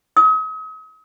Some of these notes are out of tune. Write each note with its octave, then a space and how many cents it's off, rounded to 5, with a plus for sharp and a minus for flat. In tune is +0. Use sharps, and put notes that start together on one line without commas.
D#6 +40